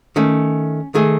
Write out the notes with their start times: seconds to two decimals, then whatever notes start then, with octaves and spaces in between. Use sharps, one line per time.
0.16 D#3 A3 C#4
0.95 D#3 A3 G#4